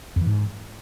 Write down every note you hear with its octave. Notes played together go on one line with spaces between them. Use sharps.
F2
E3
G#2